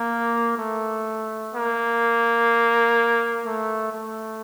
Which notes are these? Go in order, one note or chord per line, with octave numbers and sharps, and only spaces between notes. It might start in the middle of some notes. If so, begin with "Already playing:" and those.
Already playing: A#3
A3
A#3
A3
A3